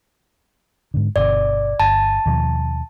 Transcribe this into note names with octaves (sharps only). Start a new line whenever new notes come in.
G#2 D3
G1 B2 D3 D5
G1 A5
D#2 B2 F3